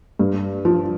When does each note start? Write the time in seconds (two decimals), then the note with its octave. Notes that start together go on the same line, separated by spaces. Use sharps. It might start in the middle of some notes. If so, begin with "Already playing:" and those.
0.19 G2
0.65 F3